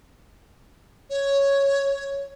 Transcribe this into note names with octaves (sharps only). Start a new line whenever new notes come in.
C#5